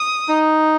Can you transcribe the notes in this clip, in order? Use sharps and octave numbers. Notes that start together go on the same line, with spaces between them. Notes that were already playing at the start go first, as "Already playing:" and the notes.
Already playing: D#6
D#4